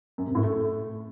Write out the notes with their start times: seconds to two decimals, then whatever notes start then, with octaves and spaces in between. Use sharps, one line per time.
0.18 F#2
0.27 C3
0.35 A2
0.43 A3